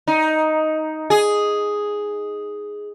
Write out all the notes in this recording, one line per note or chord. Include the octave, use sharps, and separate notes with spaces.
D#4
G#4